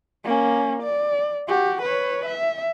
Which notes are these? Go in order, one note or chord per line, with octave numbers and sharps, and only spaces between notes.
A#3 C#4
D5
F#4 G4
B4 C#5
E5